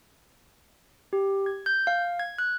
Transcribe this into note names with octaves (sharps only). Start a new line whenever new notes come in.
G4
G#6
G6
F5
G#6
F#6